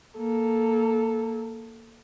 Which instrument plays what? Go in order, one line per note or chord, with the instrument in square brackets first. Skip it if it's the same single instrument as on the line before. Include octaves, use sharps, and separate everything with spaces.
[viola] A#3 A4